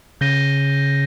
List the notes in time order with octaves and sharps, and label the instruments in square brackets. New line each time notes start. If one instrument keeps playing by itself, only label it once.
[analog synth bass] C#3 [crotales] G6 A#6 D#7 G7